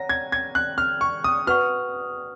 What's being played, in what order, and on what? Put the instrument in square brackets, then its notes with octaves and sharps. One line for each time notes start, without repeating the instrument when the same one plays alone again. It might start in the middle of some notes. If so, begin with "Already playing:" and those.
Already playing: [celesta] C#5 F#5 A#5 [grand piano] A#6
[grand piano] G#6
G#6
F#6
F6
C#6
D#6
[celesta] F#4 B4 F#5 C#6 [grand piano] F6